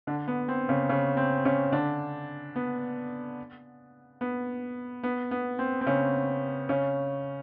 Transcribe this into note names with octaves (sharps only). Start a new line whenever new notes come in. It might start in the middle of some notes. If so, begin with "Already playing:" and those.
D3 D4
B3
C4
C#3 C#4
C#3 C#4
C4
C#3 C#4
D3 D4
B3
B3
B3
B3
C4
C4
C#3 C#4
C#3 C#4